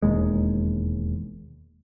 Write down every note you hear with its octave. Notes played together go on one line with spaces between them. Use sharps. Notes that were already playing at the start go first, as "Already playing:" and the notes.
E1 D#2 G#3